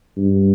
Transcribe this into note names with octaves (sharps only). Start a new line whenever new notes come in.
G2